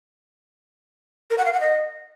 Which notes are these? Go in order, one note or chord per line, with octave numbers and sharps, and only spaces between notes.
A#4
F#5
F5
F#5
D#5